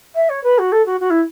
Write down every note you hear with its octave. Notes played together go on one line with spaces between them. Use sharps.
E5
C#5
B4
F#4
A4
F#4
F#4
E4